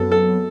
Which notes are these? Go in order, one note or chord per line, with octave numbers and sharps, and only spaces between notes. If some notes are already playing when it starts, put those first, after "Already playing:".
Already playing: F#2 F#3 B3 A4
A4